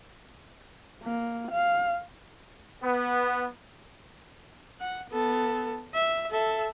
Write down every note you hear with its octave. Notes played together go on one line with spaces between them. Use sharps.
A#3
F5
B3
F#5
B3 A4
E5
A4 E5